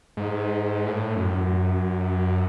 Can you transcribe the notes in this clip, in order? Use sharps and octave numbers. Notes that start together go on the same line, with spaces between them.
G#2
A2
F#2